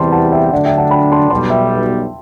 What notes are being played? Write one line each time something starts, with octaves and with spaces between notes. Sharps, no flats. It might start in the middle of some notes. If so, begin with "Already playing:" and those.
Already playing: E2 C3 E3 G3 A5 C6
F#5 A5
E5 G5
D3 F#3 A3 D4 D5 F#5
E5 G5
F#5 A5
G5 B5
A5 C6
B1 B2 G3 A5 C6
E5 G5